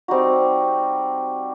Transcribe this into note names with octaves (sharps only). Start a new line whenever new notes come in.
G3 C4 D#4 F#4